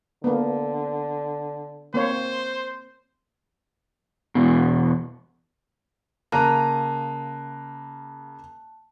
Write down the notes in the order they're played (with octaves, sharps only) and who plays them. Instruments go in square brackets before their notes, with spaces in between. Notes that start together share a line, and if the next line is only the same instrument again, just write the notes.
[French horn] D3 [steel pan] A#3 B3
[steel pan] A#3 C4 C#5 [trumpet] C5
[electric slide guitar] E2 B2
[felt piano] C#3 F#6 D#7 [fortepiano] A#3 A#5 [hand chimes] A5